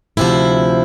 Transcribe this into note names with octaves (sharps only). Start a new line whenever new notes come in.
D2 C3 F3 E4